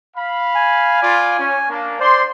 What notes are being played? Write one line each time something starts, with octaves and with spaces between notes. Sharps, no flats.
F5 B5
G#5
F4 D5
C#4
A#3 D4
C5 D5 C6